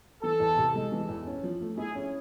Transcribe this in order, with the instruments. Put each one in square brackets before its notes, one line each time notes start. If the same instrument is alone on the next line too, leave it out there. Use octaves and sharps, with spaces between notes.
[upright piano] E3 [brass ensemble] A4
[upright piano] E2
C3
G#3
E3
E2
C#4
F3
A3
[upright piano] E4 [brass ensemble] G#4
[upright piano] C#4